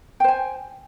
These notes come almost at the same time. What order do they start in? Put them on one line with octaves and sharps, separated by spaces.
G5 C5 G#5